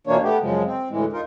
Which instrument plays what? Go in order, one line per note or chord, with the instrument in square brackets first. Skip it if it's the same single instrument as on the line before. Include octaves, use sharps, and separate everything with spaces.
[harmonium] F2 B2 E3 A#3 D4 C#5
A3 B3 G4
F#2 C#3 F3 G#3
C4
D2 A2 E3 G#3
E2 D#4 F4 A#4